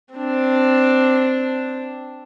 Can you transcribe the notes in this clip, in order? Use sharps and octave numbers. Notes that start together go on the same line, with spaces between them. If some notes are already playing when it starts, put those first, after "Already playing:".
C4 D4